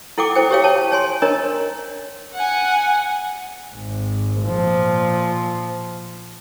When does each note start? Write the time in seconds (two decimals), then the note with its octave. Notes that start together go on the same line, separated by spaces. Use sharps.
0.18 E4 A4 F#5 G5 D6
0.35 E4 A4 C5 G5
0.51 G4 C5 C#5 F5 G5
0.64 C#5 A5
0.92 C#5 G#5 C6
1.22 D4 A#4 C#5 D#5 A#5
2.34 F#5 G#5
3.75 G#1
4.43 A#2 F3